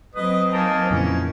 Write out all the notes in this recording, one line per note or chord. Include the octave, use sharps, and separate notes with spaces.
F#3 C4 B4 D#5 D#6
D#3 A#3 A#4 D#5 G#5 A5
F2 A#2 C#3 E3 C#4